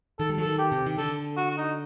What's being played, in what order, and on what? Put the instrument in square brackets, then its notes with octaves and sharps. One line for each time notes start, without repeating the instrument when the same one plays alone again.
[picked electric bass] D#3 [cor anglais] A4
[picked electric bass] G3
F#3
[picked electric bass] D#3 [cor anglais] A4
[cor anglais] G4
[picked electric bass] C3
D#3
[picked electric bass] D3 [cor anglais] A4
[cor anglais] F#4
F#4
D#4